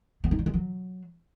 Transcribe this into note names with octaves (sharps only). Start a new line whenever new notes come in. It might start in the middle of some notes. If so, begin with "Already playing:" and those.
B3
D#4
G3
G#3
F#3